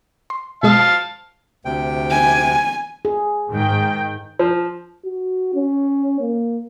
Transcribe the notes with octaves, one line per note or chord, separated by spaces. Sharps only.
C6
B2 G#3 F5 A5 D#6 F6
D2 C3 G5
G#5
G#4
G#2 D#3 G5
F3
F#4
C#4
A#3